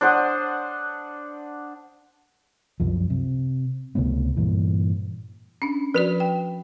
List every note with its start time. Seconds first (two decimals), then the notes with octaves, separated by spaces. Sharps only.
0.01 D4 C5 F#5 D#6
2.80 C2 F#2 F3
3.10 C3
3.95 C#2 C3 A3 B3
4.37 G2 A#2 E3
5.62 C#4 D4
5.94 F3 F#4 B4 D5
6.20 G5